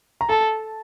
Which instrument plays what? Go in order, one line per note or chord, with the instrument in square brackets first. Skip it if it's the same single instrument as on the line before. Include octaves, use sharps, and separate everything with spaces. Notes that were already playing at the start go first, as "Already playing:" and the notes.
[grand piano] A#5
[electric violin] A4 [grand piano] A5